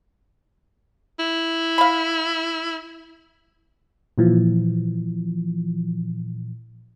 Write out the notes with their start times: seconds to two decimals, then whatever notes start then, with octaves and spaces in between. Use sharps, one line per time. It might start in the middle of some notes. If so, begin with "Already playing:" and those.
1.19 E4
1.78 F5 B5
4.18 A#2 E3 F3